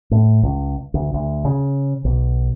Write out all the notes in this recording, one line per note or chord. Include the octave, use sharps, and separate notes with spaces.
A2
C#2
D2
D2
C#3
B1